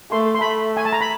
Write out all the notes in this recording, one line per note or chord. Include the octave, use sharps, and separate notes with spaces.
A3 C6
C6
A3 B5
G#5
A5
A#5
B5